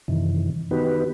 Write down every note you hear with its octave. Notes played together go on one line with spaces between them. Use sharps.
F#2 C3 D#3 E3
D#3 B3 D#4 F#4 G4 B4